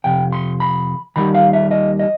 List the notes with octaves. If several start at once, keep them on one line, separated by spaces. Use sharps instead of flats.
F2 C3 G5
C6
B5
D#2 D#3 G3 B5
F5
E5
D#5
D#5